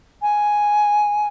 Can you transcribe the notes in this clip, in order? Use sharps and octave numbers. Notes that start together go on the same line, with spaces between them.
G#5